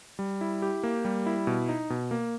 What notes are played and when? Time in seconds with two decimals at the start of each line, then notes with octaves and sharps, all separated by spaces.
0.19 G3
0.41 E4
0.62 G4
0.83 A#3
1.05 G3
1.26 E4
1.47 B2
1.69 D#4
1.90 B2
2.11 A#3